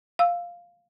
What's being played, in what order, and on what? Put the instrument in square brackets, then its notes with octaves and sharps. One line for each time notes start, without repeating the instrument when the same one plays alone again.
[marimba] F5 E6